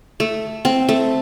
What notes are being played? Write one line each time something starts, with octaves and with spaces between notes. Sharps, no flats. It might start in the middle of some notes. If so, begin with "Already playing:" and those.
A3
C4
A3